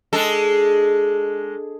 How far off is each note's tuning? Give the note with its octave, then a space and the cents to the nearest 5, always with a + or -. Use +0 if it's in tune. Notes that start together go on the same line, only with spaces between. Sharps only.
G#3 +0 D4 +0 A4 +0